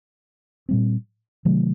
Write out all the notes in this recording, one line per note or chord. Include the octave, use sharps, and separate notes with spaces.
A#2 G3 C4
C3 D#3 F#3 A3